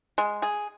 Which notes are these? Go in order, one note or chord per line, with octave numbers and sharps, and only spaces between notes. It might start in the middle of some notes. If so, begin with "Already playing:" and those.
G#3
G#4